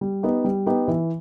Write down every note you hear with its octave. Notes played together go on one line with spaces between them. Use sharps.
G3
B3 D#4 G4
G3
B3 D#4 G4
E3